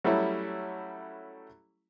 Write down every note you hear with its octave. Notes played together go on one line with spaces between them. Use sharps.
F#3 G3 A3 C#4 E4